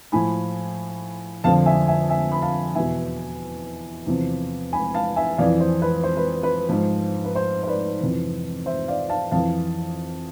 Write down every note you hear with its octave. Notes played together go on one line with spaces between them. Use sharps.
A2 F3 G#5 B5
F2 D3 F3 F5 A5
E5 G#5
E5 G#5
E5 G#5
B5
F5 A5
E2 B2 E5 G#5
E2 C3 F3
G#5 B5
F5 A5
E5 G#5
F2 E3 D5 F5
C5
B4
C5
B4
B4
G#2 F3
B4
C5
C5
B4 D5
F2 C3 E3
C5 E5
D5 F5
F5 A5
F2 E3 F5 A5